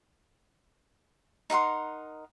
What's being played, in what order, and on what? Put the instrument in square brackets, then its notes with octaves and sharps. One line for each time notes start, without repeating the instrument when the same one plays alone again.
[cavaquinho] D#4 A#4 F#5 C6